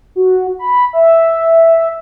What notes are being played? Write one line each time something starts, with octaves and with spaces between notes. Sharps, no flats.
F#4
B5
E5